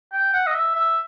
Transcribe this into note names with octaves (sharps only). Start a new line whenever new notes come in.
G5
F#5
D#5
E5
E5